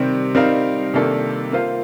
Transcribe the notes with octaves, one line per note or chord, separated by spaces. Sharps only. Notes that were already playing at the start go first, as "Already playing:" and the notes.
Already playing: C3 D#3 G3 C4
G3 C4 D#4 A#4 F5
C3 D#3 A#3 D4 A4
A#3 F4 C5 F5